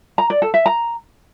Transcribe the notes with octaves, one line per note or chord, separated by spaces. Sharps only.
A#5
D5
A4
E5
A#5